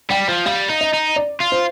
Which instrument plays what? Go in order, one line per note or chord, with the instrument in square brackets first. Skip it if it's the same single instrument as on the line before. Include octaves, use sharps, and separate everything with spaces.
[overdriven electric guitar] G3 [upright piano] G5
[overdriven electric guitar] F3
[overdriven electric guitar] G3 [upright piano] F5
[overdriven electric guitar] D#4
[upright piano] D#5
[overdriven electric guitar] D#4
[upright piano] D5
[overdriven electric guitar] F4
[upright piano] C5